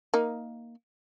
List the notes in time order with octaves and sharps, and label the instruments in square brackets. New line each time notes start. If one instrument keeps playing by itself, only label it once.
[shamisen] A#3 D#4